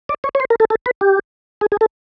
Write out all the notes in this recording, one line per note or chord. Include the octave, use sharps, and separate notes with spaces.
D5
C#5
C#5
C5
A#4
A4
A4
B4
G4
G#4
G#4
A4